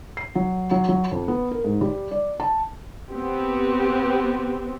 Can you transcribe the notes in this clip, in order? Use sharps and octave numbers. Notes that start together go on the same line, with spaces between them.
C7
F#3
F#3
F#3
F2
B3
A#4
G#2
G3
D5
A5
B3 C4 G4